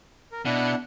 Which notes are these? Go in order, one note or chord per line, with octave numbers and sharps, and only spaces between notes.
A#4
B2 D4 E4 F#5